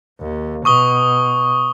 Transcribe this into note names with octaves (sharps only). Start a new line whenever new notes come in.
D#2
B2 C#6 D#6 G7